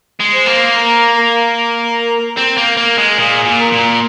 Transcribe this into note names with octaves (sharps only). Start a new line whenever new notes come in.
G#3
C5
A#3
A#4
A#4
C4
A#3
A#3
G#3
A#2 G#4
A#2
A#4
A#2